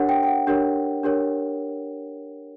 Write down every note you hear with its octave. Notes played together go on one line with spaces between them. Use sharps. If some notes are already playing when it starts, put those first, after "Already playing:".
Already playing: D4 G4 A#4 C#5 F#5
G5
G5
F#5
D4 G4 A#4 C#5
D4 G4 A#4 C#5